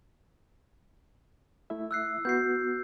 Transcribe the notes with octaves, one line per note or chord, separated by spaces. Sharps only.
A3 E4 E5
E6 F#6 C7
B3 F#4 G6 C7